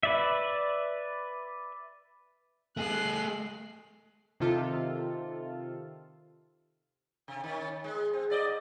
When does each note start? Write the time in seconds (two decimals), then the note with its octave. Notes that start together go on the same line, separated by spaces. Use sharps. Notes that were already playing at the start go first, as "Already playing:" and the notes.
0.03 B4 D5 E5
2.77 A3 G#4 F#6 C7
4.40 C3 D#3 F4 A4
7.28 C3
7.44 D#3 C#4
7.84 G#3
8.13 C4
8.30 G#2 D5 D#5